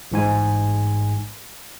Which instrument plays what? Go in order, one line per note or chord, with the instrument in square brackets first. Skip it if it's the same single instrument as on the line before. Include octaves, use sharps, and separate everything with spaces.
[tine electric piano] A1 G#2 G#5